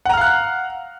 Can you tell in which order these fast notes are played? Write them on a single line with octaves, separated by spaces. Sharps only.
F#5 A#5 F6 F5 F#6